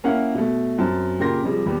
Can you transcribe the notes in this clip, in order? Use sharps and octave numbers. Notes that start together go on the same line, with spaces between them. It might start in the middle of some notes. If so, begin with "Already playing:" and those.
A#3 C#4 E4 A#4 F5 F#5
B2 A3
F#2 C4 A5
A#2 C#3 G4 A#4 C6 A#6
C3 F3 G3 G#3
D#2 G3 B3